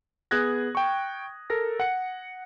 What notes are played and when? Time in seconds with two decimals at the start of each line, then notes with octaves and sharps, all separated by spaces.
0.31 B3 G#4 D#6 F#6 G#6 A#6
0.75 G5 C#6
1.50 A4 A#4 A#6
1.80 F#5 C#7